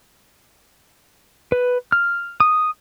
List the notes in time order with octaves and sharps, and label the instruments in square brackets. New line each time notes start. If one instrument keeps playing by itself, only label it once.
[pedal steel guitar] B4
F6
D#6